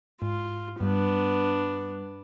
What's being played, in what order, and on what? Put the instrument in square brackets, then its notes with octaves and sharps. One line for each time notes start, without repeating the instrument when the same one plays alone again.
[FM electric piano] G#2 [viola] F4
[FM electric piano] G2 G3 [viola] B3 D4